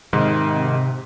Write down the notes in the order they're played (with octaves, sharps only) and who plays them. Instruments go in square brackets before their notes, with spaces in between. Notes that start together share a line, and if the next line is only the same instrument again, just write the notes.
[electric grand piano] G#2 [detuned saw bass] C3 [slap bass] D#3